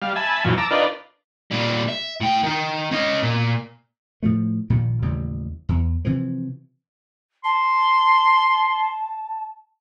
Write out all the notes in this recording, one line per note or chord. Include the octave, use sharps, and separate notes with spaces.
G3 F5
E5 G#5 A5 B5
F#2 A#2 E3 F#3 F4
A5 A#5 D6 E6
D4 D#4 F4 A#4 B4 D5
A#2 G3
E5
A2 G5
D#3 D#4
C#4 D#5
A#2
A2 F3 A3
A#1 A#2 D#3 A#3
A1 D#2 C#3 G3
E2
C3 E3 F3
A5 C6